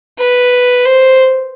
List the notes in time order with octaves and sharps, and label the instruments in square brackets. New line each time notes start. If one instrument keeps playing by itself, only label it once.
[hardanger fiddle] B4
C5